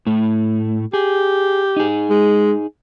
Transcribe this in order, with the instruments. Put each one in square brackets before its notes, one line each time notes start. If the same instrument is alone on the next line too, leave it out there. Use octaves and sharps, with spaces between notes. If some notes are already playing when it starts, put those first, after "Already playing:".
[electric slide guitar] A2 A3
[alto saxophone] G4 [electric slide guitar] G#4
[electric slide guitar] D#4 G#4
[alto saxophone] G#3